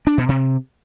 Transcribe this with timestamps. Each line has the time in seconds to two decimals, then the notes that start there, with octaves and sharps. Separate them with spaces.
0.07 D4
0.18 B2
0.29 C3